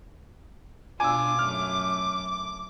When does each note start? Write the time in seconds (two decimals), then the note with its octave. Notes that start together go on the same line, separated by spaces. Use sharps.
1.00 B2 D4 F4 G#5 D6 E6
1.39 F#2 A3 F6